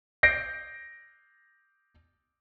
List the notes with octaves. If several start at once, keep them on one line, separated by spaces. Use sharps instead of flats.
G6 A#6 C7 D7